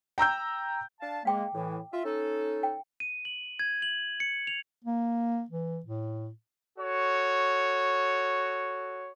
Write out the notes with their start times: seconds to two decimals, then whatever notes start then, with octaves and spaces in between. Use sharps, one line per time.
0.18 G5 A#5 E6 G6
1.01 D4 F5 A5
1.25 G#3 A#3 F5 G5 D6
1.54 A2 E3
1.93 F4 E5
2.05 C#4 D#4 A4
2.63 G5
3.00 D#7
3.25 F#7
3.59 G#6
3.82 F#7
4.20 C#7
4.47 F7
4.84 A#3
5.50 E3
5.86 A2
6.77 F#4 A4 C#5